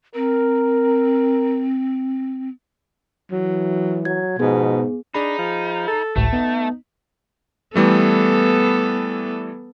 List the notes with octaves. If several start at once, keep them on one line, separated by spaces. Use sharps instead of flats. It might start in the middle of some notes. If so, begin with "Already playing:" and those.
C4 A#4
E3 F#3
F#3 G#6
G#2 B2 F3 B3 G#4
D4 D#4 G#4 B5
F3
A4
G#1 C#2 A2 A3
B3 D#4
E3 G3 A3 B3 A4